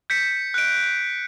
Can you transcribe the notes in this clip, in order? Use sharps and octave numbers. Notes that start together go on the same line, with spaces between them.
G6 B6 C#7
F#6 D7